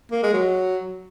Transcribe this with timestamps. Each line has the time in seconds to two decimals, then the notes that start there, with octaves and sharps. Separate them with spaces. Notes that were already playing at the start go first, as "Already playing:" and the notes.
0.11 A#3
0.23 G#3
0.33 F#3